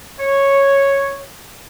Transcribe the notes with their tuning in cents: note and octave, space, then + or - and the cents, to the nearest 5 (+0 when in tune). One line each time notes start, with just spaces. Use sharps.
C#5 -5